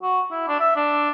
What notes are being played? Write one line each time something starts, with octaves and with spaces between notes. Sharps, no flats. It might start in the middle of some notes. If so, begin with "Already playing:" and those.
F#4
E4
D4
E5
D4